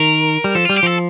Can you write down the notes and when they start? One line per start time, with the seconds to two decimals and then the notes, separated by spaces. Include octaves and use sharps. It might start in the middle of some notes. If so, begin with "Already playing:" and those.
Already playing: D#3 A#4
0.44 G3
0.55 F3 A4
0.65 G3 F4
0.76 G4
0.83 F3 A4